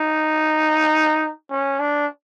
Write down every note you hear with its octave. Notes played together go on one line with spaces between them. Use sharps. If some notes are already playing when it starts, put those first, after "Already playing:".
Already playing: D#4
C#4
D4